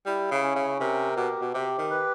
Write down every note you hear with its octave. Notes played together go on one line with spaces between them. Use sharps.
G3 E4
C#3
C#4
C#3
C3 A#4
B2 G4
B2
C3 G4
D#3
B4